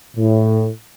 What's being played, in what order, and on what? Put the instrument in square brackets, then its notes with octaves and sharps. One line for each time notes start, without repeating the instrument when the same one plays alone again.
[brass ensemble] A2